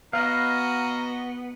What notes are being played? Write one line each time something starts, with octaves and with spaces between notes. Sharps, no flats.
B3 F#4 B4 D#5 F5 A#5